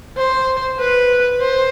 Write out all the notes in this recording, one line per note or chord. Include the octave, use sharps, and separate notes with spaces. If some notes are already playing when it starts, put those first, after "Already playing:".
C5
B4
C5